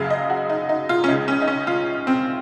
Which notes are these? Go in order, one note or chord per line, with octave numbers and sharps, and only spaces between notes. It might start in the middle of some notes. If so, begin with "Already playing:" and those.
Already playing: F#1 F#2 C#3 F#3 F5
D#5
F#4
D#4
D#4
F4
C#4
C#2 C#3 G#3 D#4
C#4
D#4
C#4
F4
C4